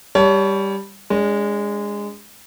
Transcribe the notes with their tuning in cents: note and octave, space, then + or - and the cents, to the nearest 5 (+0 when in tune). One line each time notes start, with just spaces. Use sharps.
G3 +10 C#5 +30 A5 +0
G#3 -15 D4 -45